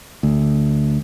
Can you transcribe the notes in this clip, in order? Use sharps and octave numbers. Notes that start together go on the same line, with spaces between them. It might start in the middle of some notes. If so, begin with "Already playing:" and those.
D2